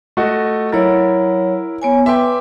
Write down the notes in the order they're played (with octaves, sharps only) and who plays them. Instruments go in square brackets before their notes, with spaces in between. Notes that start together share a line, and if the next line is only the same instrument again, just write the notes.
[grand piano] A3 F#4 D#5
[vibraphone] F#3 C#5 [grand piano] E4 A#4
[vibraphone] B3 C#5 G#5
[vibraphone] B4 C6 D6 [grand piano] E5 G5